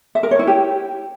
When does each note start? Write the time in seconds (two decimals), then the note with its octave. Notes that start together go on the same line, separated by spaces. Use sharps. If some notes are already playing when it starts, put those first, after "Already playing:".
0.15 E5
0.23 A#4
0.31 C#5
0.39 E4
0.47 G4